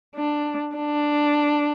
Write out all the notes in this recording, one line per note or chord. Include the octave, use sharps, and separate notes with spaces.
D4
D4